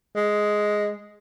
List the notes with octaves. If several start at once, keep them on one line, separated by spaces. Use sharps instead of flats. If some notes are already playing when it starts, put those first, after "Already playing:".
G#3